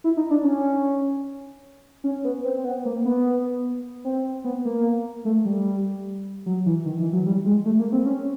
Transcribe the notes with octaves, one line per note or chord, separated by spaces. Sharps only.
E4
D#4
D4
C#4
C#4
B3
C4
C4
B3
A#3
B3
C4
B3
A#3
A3
G3
F#3
E3
D#3
E3
F#3
G3
G#3
A3
A#3
C4
C#4